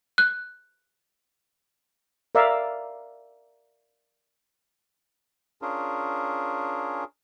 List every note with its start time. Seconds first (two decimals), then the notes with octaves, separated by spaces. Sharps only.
0.18 F#6
2.35 A#4 D5 E5 F5
5.62 C#4 D4 F4 G#4 A#4